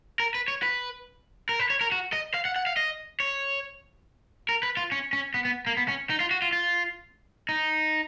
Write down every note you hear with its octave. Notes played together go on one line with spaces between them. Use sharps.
A#4
B4
C#5
B4
A#4
B4
C#5
A#4
F#4
D#5
F5
F#5
F#5
F5
D#5
C#5
A#4
B4
F4
C#4
C#4
B3
B3
A#3
B3
C#4
D#4
F4
F#4
F4
F4
D#4